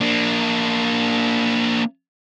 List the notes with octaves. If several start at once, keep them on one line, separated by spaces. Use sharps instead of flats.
A#3 D4